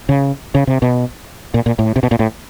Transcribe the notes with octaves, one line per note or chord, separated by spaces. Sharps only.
C#3
C#3
C3
B2
A#2
A#2
A2
C3
B2
A#2
A2